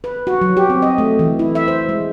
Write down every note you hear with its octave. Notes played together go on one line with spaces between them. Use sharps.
B4
F#4
F#3
G4
C4
D#5
A3
E3
E4
E5
C5
G#3